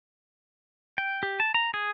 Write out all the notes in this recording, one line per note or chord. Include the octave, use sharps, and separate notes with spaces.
G5
G4
A5
A#5
G#4